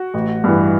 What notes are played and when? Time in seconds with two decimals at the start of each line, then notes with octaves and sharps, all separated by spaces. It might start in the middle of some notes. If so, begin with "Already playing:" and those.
Already playing: F#4
0.14 A1
0.44 G2 E3